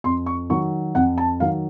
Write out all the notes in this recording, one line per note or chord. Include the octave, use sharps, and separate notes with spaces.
F2 C6
C#6
D#3 F#3 C#6
F2 F#5
A5
D#3 F#3 F5